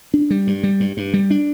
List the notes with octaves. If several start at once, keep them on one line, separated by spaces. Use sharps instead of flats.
D4
G3
G2
G3
G2
G2
G3
D4